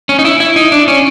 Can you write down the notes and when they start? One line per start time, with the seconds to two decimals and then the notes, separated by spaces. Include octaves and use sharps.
0.09 C#4
0.19 D#4
0.25 E4
0.40 E4
0.56 D#4
0.72 D4
0.88 C#4